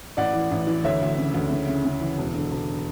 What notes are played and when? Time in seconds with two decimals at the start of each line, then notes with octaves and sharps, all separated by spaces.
0.17 A1 D5 F#5
0.33 E3
0.51 A1
0.67 E3
0.84 D2 C#5 E5
1.01 D2
1.18 C#3
1.34 D2
1.51 C#3
1.67 C#3
1.85 C#3
2.01 E3
2.18 E1
2.34 D3
2.51 E1